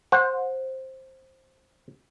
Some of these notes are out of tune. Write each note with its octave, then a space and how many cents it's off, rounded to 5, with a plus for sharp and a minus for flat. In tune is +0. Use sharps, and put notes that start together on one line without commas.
C5 +10 F#5 -20